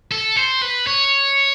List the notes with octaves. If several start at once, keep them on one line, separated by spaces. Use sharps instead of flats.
A4
C5
B4
C#5